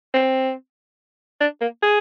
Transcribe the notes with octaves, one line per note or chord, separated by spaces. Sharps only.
C4
D4
A#3
G#4